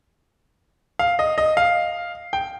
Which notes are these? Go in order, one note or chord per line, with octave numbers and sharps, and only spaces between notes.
F5
D#5
D#5
F5
G5